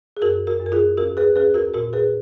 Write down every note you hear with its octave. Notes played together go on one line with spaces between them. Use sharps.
G#4
F#2 F#4 A#4
F#4 A#4
F#2
A#4
F4 G#4
D#2 F#4 A#4
G#4 B4
D#2 G#4 B4
F#4 A#4
A#2 F#4 A#4
G#4 B4